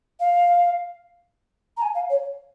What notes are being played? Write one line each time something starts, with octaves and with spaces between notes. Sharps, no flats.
F5
A#5
G#5
F5
C#5